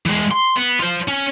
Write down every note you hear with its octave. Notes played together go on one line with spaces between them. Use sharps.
E3 G#3
C6
B3
F4 C5
C#4